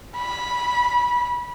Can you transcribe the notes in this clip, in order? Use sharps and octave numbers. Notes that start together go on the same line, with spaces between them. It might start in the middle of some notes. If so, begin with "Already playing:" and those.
B5